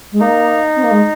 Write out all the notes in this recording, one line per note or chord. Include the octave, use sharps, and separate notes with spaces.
G#3
A#3 D#4
C4
A#3
G#3